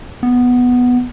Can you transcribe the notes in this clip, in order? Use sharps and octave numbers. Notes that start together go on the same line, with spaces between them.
B3